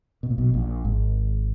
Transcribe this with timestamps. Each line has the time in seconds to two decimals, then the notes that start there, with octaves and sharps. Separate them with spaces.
0.23 B2
0.30 A#2
0.38 B1 B2
0.54 A#1 A#2
0.85 G#1 G#2